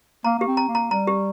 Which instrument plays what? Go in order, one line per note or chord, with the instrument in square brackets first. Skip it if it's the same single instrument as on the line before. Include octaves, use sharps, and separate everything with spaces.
[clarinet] A#3 [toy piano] A#5
[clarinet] A#3 [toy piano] G4
[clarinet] C4
[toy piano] A#5
[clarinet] A#3
[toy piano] A#5
[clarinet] G3 [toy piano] A#5
[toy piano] G4